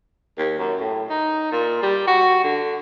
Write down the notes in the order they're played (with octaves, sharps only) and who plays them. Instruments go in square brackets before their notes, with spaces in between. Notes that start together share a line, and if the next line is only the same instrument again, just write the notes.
[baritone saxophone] D#2
F#2
A2
D#4
A#2
G3
F#4
D3